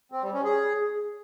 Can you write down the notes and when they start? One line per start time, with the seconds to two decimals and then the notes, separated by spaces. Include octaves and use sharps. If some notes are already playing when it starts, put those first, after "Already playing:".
0.12 C4
0.23 G3
0.34 C#4
0.44 G#4